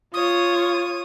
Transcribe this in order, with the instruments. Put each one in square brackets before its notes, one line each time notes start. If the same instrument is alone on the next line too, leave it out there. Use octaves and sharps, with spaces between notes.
[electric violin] F4 C#5 [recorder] D#6